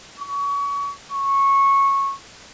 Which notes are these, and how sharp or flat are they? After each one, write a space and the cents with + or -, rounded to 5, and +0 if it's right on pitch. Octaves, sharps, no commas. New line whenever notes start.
C#6 +30
C#6 -15